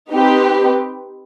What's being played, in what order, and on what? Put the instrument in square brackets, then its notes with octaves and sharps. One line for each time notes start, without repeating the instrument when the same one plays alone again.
[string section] C4 D#4 G4 B4